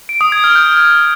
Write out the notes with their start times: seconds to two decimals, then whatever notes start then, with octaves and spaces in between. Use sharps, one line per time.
0.09 D7
0.21 D#6
0.32 G#6
0.44 F6
0.55 G6